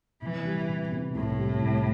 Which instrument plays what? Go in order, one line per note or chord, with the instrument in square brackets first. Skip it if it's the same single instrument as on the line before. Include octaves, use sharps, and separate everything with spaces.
[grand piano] C3 [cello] E3
[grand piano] G3
C3
C3
[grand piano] C2 [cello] A2
[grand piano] G3
C2